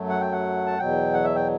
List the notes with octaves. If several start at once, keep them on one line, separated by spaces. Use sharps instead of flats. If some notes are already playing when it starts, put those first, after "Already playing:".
Already playing: F#2 F#3 A3
F#5
G5
F#5
A5
E2 B2 F#3 G5
F#5
E5
G5